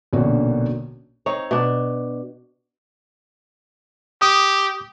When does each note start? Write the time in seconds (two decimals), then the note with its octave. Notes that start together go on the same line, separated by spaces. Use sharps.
0.13 A#1 B2 D3 A#3 C#4 F#4
1.26 C4 D#4 C#5
1.51 B2 D4
4.22 G4 D#6